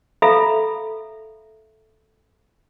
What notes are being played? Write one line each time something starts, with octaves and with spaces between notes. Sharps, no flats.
A4 E5 F5 A#5 B5